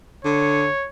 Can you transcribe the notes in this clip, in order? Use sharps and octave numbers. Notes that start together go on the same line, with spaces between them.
D3 C#5